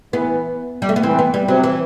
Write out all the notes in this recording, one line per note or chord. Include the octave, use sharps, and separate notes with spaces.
E3 B3
G3
A3
B3
E3 C4
B3
G3
C3 F#3
E3